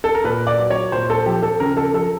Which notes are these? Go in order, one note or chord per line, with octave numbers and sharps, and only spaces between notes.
A4
A#4
A#2 B4
D5
F#3
C#5
A#2 C5
A4
F3 G4
A4
C#3 A#4
A4
F3 A4